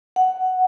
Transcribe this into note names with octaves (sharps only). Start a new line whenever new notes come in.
F#5